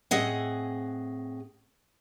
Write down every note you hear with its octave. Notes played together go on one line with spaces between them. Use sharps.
A2 C4 G#4 D#5 F#5